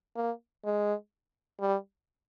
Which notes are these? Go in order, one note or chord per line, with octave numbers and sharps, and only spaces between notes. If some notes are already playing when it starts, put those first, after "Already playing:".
A#3
G#3
G3